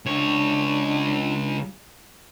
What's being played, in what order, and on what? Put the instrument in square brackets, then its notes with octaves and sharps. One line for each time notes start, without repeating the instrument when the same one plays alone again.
[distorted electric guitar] C#2 C#5 [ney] D4